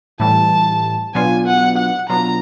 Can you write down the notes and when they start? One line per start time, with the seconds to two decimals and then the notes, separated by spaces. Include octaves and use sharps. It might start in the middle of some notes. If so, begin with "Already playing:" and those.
0.20 A2 E3 G3 A5
1.15 B2 F#3 B3 D4 F4 G#5
1.47 F#5
1.78 F#5
2.10 B2 F#3 B3 D4 F4 A#5